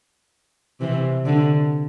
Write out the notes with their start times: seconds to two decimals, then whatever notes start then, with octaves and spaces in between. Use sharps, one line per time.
0.80 C3 E3
1.25 D3